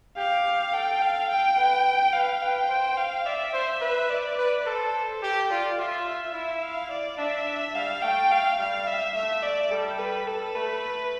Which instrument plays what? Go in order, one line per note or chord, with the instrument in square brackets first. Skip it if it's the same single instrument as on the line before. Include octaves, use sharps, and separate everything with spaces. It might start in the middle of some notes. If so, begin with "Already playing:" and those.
[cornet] G4 [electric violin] F5
[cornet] A4 [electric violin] G5
[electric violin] F5
G5
[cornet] B4
[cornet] B4 [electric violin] F5
[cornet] B4 [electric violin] G5
[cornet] C5
[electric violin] F5
[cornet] D5 [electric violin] E5
[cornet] C5
B4
[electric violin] D5
[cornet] B4
[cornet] A4 [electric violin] C5
[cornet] G4 [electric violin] A4
[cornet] F4 [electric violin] D5
[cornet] F4 [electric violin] E5
[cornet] E4
[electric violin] F5
D5
[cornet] D4 [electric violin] E5
[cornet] G3 [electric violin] F5
[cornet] A3 [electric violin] G5
[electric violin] F5
[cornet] G3 [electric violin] F5
[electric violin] E5
[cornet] A3 [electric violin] E5
[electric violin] D5
[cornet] G3 [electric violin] A4
[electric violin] B4
A4
[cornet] A3 [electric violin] B4